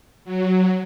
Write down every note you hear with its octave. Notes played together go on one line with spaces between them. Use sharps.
F#3